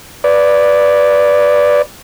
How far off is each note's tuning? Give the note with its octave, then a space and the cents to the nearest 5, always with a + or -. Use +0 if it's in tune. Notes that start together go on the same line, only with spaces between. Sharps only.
B4 -5 D5 +0